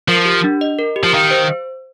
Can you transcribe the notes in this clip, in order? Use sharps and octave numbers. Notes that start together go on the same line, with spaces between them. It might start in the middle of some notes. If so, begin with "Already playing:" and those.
F3 A#4
G4
D4
D#5
A#4
G4
F3
D#3 F5
C5